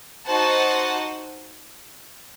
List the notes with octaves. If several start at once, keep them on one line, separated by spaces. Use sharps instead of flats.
D#4 F#4 C5 F#5 A5